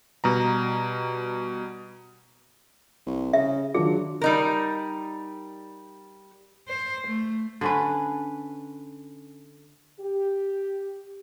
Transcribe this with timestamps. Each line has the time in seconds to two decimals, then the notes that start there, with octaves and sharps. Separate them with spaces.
0.24 B2 G3 A#5
3.07 C2
3.33 C#3 E5
3.75 D#3 F#3 D4 F4 G#4
4.21 G3 D#4 A#4
6.69 C5
7.07 A3
7.61 D3 C#4 B4
9.99 G4